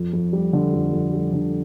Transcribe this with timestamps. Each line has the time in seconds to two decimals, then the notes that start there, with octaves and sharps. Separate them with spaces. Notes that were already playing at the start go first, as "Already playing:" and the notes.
Already playing: F2
0.13 F2
0.33 G3
0.53 D3
0.73 F2
0.93 F2
1.13 G3
1.33 D3